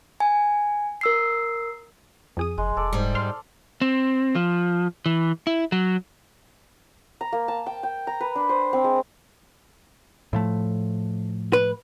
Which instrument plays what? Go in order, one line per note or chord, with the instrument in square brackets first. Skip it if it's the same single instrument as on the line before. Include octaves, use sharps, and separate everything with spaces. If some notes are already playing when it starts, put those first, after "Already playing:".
[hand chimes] G#5
A#4 E6 C7
[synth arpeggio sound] F2 G#4 D#6
[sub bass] F#1 [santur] G#3
[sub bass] E1 [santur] A4 D5
[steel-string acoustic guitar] G#2 G3
[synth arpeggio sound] C5 C6 F6
[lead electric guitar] C4
F3
E3
E4
F#3
[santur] A#5
A#3
A5
G5
G5
A#5
B4
D4
C5
C4
G#3
[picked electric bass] A2 F3 A3
[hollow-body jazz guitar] B4